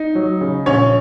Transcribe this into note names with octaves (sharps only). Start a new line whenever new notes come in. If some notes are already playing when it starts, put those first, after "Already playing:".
Already playing: D#4
F#3
C#3
A#1 C#4 C#5